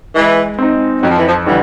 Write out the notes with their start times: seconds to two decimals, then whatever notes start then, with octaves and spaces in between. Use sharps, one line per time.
0.15 E3 G#3
0.59 C4 D#4
1.02 F2 F#3
1.10 F3
1.19 E3
1.27 F3
1.47 D3 E3 G3